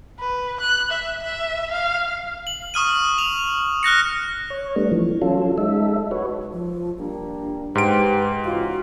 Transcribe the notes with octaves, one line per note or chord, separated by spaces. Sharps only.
B4
F#6
E5
E5
F5
F#7
C#6 D#6 F6 D#7
F7
F6 F#6 A#6 C#7
C#5
G3 A3 B3 D4
E3 F3
F#3 C#4 F4 A4
G#3 D#4 A4 E5
F#4 B4 C#5
F3
G3 A#3 D4
G#2 G4 B4 C5 D7
C#3 E3 F4 F#4